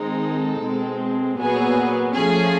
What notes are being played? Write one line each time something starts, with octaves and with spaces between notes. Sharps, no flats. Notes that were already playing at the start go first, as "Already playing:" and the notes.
Already playing: D#3 G#3 C4 D#4
A4
B2 G#3 C4
A#2 F#3 B3 G#4
F3 A3 C#4 G#4